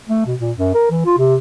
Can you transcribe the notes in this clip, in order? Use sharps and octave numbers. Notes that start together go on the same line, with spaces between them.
A3
B2
A#2
F#2
A#4
E3
F4
C3